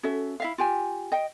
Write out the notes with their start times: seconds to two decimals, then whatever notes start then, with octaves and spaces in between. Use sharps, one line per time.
0.03 C#4 F#4 A4 E5
0.40 E4 E5 F5
0.58 F4 G4 G#5
1.12 D#5 G5